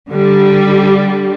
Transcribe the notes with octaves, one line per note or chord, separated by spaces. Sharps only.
D3 G3